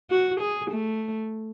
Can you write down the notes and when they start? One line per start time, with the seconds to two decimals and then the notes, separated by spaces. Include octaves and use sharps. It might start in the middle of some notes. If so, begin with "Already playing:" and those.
0.10 F#4
0.41 G#4
0.71 A3